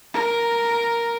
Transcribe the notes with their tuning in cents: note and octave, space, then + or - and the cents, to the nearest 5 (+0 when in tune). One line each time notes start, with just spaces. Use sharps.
A#4 +0